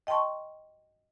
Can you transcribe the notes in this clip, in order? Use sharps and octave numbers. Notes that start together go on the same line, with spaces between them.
D#5 G5 A5 C6 C#6